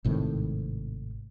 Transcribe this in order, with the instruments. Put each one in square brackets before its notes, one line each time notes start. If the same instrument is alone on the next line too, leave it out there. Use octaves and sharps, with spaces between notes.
[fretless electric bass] G#1 A2 C3 D#3